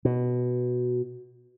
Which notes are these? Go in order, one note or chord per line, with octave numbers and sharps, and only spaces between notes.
B2